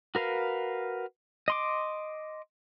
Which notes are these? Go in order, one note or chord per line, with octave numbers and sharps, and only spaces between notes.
F#4 A#4 B4 F5
D#5 C6 D6